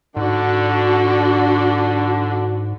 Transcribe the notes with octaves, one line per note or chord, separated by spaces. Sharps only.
G#2 D3 D4 F#4